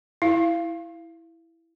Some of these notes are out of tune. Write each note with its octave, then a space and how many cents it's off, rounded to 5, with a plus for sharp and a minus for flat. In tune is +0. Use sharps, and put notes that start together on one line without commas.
E4 +0 F5 -20